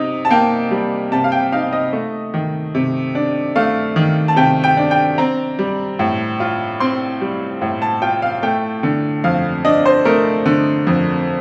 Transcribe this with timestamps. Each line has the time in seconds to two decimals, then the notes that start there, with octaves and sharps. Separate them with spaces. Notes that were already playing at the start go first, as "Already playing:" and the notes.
Already playing: C3 D#4
0.25 A5
0.30 A#3 G5
0.71 G3
1.12 C3 A5
1.24 F5
1.32 G5
1.52 D#4 F5
1.73 D#5
1.93 A3
2.34 D#3
2.75 C3
3.15 D4
3.56 A3 F5
3.96 D#3
4.28 A5
4.36 C3 G5
4.64 G5
4.77 D4
4.91 G5
5.18 C4 A#5
5.59 G3
5.99 A2
6.40 F4
6.80 C4 C6
7.21 G3
7.61 A2
7.82 A5
8.02 F4 G5
8.22 F5
8.43 A3 G5
8.83 D3
9.24 F2 F5
9.65 D4 D#5
9.86 C5
10.05 A3 A#4
10.46 D3
10.87 F2